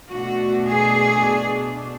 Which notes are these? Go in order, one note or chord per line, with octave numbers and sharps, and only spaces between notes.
B2 A3 D4 F#4
G#4